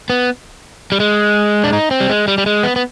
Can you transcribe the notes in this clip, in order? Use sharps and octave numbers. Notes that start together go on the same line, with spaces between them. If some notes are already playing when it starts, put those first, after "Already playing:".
B3
G3
G#3
D4
D#4
C4
G3
G#3
G3
G3
G#3
B3
B3